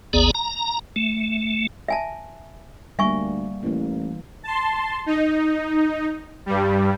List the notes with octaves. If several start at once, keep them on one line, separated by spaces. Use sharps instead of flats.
G#1 D#2 B3 G#4 D5 A#5
A#5
A3
E5 G#5 A5
D2 G3 A#3 E5 G#5 C#6
A1 E3 A#3
A5 C6
D#4
G2 G3